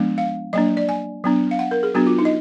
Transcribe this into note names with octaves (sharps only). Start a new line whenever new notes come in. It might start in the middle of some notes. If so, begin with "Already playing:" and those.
Already playing: F3 G#3 B3 D4
F5
F#3 A#3 D4 D#5
D5
G#5
F#3 B3 D4
F5
F#5
A#4
G#4
F#3 B3 D4 F#4
F4
D#4
D#5